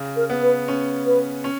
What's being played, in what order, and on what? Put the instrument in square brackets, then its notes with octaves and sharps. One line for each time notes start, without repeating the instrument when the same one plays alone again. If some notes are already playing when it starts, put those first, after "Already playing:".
Already playing: [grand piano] C#3
[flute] A#4
[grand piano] B3
[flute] B4
[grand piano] C#4
[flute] B4
[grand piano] C#4